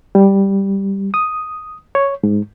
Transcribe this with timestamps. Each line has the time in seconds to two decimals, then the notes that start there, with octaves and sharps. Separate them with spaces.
0.15 G3
1.14 D#6
1.95 C#5
2.23 G#2